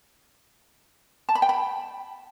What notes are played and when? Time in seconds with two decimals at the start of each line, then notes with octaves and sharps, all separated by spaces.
1.29 A5
1.35 B5
1.42 G5
1.49 B5